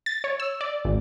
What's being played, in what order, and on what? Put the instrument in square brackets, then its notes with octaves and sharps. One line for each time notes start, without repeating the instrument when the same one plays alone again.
[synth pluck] A6
C#5
E6
D5
G#1